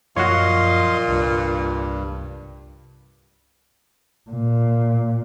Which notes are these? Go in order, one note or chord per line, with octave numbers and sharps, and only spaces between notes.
F#2 A#2 F3 F#4 C#5 D#5 F5 C6
C2 G2
A#2